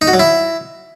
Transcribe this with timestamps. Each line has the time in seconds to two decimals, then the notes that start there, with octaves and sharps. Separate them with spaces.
0.02 D#4
0.08 F#4
0.13 F#3
0.19 E4